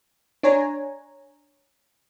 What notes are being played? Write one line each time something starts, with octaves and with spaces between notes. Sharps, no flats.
D4 C#5 G#5 A#5